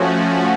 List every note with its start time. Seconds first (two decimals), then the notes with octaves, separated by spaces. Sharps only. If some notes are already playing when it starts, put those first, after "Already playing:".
Already playing: F3 A3 C#4 F#4